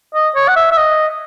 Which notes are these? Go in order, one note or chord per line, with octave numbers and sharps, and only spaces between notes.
D#5
C#5
F#5
E5
E5
D#5